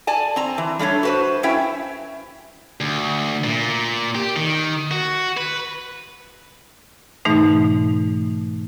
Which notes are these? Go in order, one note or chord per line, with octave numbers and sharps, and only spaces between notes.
D5 G#5 A5
C4 A#5
E3
G3 A3 D4 C#5
F#4 B4 C5
F#3 C#4 E4 E5 G5
D2
A#2
G4
D#3
F#4
B4
G#2 B2 E3 A3 D#4